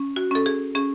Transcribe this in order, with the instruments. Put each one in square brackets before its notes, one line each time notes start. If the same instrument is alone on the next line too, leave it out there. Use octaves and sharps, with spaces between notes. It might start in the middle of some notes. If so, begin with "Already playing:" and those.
Already playing: [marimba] C#4
F#4
C#4 A4
G#4
C#4 G#4